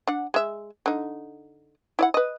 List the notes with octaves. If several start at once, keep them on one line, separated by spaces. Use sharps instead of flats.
D4 F#5
G#3 E5
D3 D#4
E4 D5 F#5
B4 D#5